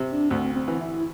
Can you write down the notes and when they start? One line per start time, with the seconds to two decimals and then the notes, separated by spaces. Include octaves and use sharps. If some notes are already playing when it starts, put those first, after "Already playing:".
Already playing: C3
0.12 D4
0.30 D2 C4
0.55 C4
0.68 E3
0.81 E4